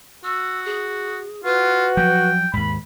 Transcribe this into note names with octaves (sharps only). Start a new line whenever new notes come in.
F#4 E6
G#4
F4 F#4 B4
F3 F#3 G5
D#2 G#2 B5